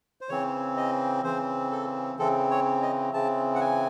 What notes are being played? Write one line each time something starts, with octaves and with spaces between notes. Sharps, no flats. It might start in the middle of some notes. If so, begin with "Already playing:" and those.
C5
C#3 E3 C4 C#5
D#5
C#3 E3 C4 C5
A4
C#3 E3 C4 A4
C#5
D#5
C#3 E3 C4 A5
F#5
G#5